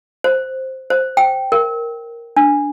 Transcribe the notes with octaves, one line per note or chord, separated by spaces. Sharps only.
C5
C5
G5
A#4
D4